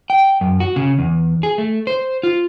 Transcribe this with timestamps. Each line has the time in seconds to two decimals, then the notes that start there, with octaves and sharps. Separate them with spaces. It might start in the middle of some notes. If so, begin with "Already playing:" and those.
0.10 G5
0.41 F#2
0.60 F#4
0.76 C#3
0.99 E2
1.43 G#4
1.58 A3
1.87 C5
2.23 F4